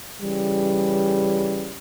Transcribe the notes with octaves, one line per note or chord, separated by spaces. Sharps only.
C#3 E3 G3